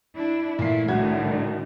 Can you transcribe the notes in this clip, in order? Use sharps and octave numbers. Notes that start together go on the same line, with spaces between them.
D4 E4
A#2 E3 A3 E4 C7
C2 A2 D3 D#3 F#4 G#6